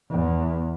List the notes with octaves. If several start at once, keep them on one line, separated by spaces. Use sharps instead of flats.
E2